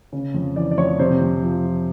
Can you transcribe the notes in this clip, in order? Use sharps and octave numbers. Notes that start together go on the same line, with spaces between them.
C#3
F2
E3 D5
D5
F2 C#5
C3 C5
F2
F3